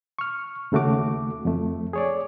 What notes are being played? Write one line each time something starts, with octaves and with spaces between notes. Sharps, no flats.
C#6 F6
D#2 C#3 A3 F#4 D6
F2 A3
G#4 C#5 D5